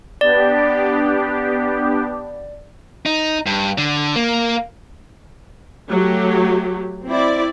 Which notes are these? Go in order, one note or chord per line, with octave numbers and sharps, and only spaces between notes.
B3 D4 G4 D5
D#4
G2
D3
A#3
F#3 A3 G4
C4 E4 D5